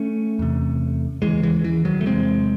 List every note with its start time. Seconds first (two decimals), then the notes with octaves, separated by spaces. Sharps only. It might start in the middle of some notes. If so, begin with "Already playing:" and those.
Already playing: A3 C#4
0.39 E2 C3
1.22 D#2 C#3 E3 G#3
1.43 E3 G#3
1.64 E3
1.85 D#3 F#3
2.01 A3
2.05 E2 C3 G#3 C4